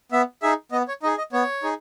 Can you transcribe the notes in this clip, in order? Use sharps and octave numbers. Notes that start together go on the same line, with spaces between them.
B3 E5
D#4 G#4 E5
B3 D#5
C#5
D#4 G#4 D#5
D#5
B3 C#5
D#4 G#4